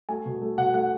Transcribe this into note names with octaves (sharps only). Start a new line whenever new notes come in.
A3 G#5
B2
A3
B2 F#5
A3 F#5